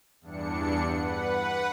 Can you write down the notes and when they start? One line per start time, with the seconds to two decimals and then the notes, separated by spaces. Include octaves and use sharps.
0.21 E2 G2 D4 C#7
0.92 B4 F#5